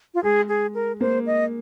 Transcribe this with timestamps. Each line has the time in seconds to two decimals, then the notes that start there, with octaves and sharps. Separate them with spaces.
0.14 F4
0.23 G#3 G#4
0.49 G#4
0.75 A#4
1.01 A#3 C5
1.26 D#5